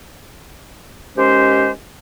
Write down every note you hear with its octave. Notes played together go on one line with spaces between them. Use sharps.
D#2 G#3 C#4 G4 C5